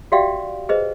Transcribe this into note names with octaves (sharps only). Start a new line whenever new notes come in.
F#4 G4 D5 E5 F5 G5
G#4 B4 C5 D#5